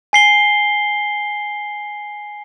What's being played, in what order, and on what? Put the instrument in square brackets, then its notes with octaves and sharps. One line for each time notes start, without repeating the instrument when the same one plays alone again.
[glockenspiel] G#5 C7 G7